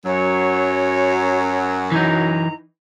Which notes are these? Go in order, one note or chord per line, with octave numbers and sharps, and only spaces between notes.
F#2 F#3 C#5
E3 D#4 A#5